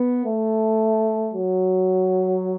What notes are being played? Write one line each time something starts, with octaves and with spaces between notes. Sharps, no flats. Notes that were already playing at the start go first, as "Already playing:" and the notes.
Already playing: B3
A3
F#3